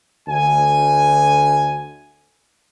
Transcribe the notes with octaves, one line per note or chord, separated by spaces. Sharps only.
D2 G#5